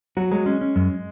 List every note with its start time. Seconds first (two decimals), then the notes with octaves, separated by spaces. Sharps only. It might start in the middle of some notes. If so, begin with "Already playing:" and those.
0.17 F#3 F#4
0.31 F#3 G#3
0.46 G#3 C#4
0.61 C#4
0.76 F#2